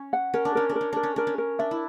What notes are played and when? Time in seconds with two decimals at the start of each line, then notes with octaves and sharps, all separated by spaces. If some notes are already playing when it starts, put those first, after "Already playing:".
Already playing: C#4
0.13 F#5
0.34 C#4 A#4
0.45 D4
0.55 C#4 A#4
0.69 D4
0.75 A#4
0.81 C#4
0.93 D4 A#4
1.03 C#4
1.16 D4 A#4
1.27 C#4
1.38 A#4
1.59 D4 E5
1.71 E4